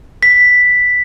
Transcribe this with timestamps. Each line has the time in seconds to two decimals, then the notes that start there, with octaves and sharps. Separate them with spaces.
0.23 B6